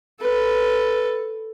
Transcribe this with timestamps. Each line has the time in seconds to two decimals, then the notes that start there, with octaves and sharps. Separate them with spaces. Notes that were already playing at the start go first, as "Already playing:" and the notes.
0.21 A4 B4